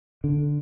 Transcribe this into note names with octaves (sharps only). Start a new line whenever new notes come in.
D3